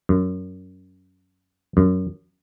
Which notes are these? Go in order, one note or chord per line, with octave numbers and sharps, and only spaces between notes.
F#2
F#2